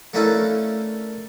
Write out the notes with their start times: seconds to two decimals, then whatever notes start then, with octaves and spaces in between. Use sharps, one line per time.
0.14 A3 A#3 C#4 D4 E4 A4